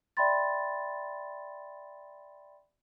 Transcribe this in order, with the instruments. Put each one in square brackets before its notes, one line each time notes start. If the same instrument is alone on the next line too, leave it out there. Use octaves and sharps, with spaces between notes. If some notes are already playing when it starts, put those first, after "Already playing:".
[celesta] D5 E5 G5 B5 C6 A6